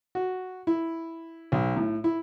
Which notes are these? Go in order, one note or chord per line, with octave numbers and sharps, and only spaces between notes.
F#4
E4
B1
A2
E4